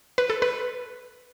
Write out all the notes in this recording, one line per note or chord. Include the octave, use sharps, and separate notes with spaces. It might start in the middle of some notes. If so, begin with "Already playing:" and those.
B4
A4
B4